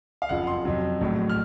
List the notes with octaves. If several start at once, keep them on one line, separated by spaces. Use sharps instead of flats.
F5
F#1 F2 C#3 F3 F#5
C6
F2 C3 F#3
A#1 A2 F#3
F6